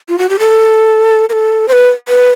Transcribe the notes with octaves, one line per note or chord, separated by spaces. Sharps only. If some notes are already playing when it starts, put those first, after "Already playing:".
F4
F#4
G4
A4
A#4
A4
C5
B4
B4